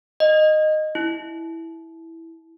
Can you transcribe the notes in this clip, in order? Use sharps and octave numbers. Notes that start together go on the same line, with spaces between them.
D#5
E4